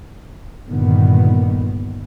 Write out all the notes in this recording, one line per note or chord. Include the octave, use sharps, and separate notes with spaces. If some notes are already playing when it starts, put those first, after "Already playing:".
G2 A#2 D3 D#3 B3